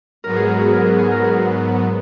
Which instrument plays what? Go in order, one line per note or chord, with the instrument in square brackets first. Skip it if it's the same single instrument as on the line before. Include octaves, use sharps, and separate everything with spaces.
[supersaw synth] G#2 F#3 B3 [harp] A#4
[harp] G#4
A#4
F#4
G#4
A#4
G#4
G#4
A#4
G#4